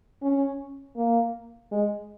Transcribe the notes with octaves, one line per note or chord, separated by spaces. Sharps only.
C#4
A#3
G#3